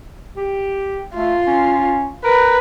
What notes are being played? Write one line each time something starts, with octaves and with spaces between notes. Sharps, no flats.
G4
A3 F4
C#4
A#4 B4